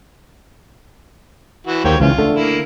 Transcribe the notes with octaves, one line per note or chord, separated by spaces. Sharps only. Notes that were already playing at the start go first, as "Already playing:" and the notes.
E3 F#4
D#2 A#3 C5 C#5 G5
C#2 E3 C#4 F4
D3 A3 A4
A#3 E4